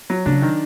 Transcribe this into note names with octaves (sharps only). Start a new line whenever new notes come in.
F#3
C#3 D4
D#3